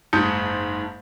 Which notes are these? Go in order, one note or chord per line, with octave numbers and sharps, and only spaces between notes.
F#1 G#2 A5 D#6 G6 C#7